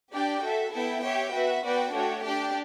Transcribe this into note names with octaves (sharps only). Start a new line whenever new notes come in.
D4 G4 D5 G5
F#4 A4 E5
B3 E4 A4 E5 G5
G4 C#5 E5 G5
B3 F#4 B4 E5
B3 F#4 B4 D5 G5
A3 D4 F#4 C#5 G5
D4 G4 D5 G5